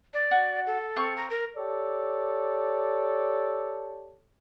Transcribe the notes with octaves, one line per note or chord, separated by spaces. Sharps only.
D5
F#4
A4
C4 F5 C#6
A#5
A#4
G4 A4 C#5 D5